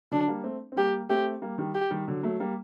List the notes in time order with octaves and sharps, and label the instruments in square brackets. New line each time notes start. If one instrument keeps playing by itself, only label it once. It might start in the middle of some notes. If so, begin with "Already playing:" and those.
[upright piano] D3 F#3 [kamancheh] D4
[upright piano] G3 A#3
A3 C4
C4
[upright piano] G3 A#3 [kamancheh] G4
[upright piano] A3 C4 [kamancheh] G4
[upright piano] G3 A#3
D#3 G3
[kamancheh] G4
[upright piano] D#3 G3
D3 F#3
F#3 A3
G3 A#3